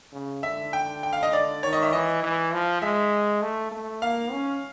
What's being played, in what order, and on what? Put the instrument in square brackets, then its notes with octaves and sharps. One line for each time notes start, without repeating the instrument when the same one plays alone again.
[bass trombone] C#3
[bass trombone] D3 [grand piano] E5
[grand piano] G5
G5
F5
D#5
D5
[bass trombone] D#3 [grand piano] C#5
[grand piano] D#5
E5
[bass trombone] E3 [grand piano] D#5
[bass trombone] E3
F3
[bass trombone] G#3 [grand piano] E5
[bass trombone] A3
A3
[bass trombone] A#3 [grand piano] F5
[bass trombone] C#4